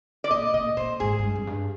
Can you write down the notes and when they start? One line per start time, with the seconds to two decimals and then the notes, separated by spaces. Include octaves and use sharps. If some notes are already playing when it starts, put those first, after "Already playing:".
0.24 D5
0.30 A#2 D#5
0.53 A#2 D#5
0.77 A#2 C5
1.00 G#2 G#4
1.19 G#2
1.23 G2
1.36 F2
1.47 G2